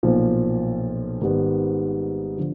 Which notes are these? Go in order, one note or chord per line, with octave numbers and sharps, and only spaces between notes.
B1 A#2 F3
G#1 G#2 D#3 G3 B3
D3 F3